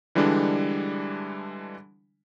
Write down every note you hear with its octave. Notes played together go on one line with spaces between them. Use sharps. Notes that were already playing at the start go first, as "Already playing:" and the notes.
D3 E3 G3 G#3 D4